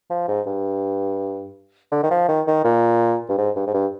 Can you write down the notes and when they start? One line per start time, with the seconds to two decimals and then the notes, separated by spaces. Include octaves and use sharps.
0.10 F3
0.28 G#2
0.47 G2
1.92 D3
2.03 D#3
2.11 F3
2.28 D#3
2.47 D#3
2.65 A#2
3.29 G2
3.37 G#2
3.56 G2
3.67 G#2
3.74 G2